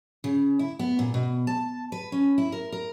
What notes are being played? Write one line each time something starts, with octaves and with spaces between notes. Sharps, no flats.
C#3
E4
B3
A#2
B2
A5
B4
C#4
E4
A#4
A#4